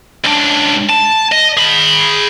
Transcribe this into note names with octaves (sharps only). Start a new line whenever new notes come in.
C#2 D4
A5
D#5
G#4 B5